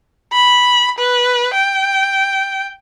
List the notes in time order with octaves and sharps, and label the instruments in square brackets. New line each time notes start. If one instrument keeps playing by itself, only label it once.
[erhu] B5
B4
G5